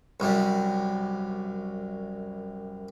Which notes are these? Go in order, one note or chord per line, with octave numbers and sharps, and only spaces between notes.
C2 F#2 G3